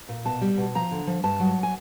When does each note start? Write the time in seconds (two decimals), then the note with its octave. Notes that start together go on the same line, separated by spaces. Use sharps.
0.09 A#2
0.25 B2 A5
0.41 G3
0.57 B2
0.75 F3 A#5
0.91 D3
1.07 F3
1.24 G2 A5
1.40 F#3
1.63 G#5